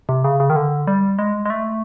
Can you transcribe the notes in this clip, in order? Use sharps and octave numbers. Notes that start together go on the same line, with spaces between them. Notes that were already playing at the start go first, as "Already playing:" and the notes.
C3
C#3
C#3
D#3
D3
G3
G#3
G#3
A3